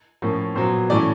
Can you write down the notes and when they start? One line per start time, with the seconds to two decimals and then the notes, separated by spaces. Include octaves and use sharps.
0.22 A2 F3 A#3 C#4
0.55 A#2 F#3 B3 C5
0.90 A2 E3 A3 C#4 D5